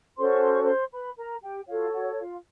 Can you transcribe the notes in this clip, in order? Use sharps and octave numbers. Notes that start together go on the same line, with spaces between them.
C#4 F#4 A4 C5 C6
C#6
C6
C#6
C5 C6
B4 B5
A#4 A#5
G4 G5
F4 F#4 A4 C#5 F5
F#4 F#5
F4 F5